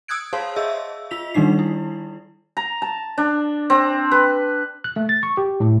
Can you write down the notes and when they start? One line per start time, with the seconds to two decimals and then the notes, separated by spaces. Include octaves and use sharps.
0.08 D#6 E6 F#6 G#6 D7
0.33 G#4 C5 C#5 F5 A5 C6
0.56 G#4 D#5 E5 E6
1.11 F4 B6 F7
1.34 D#3 G3 D4 D#4 C7
1.59 E4
2.57 A#5
2.82 A5
3.18 D4
3.70 C4
4.11 B4
4.84 F#6
4.96 A3
5.09 A6
5.23 C#6
5.37 G4
5.60 A2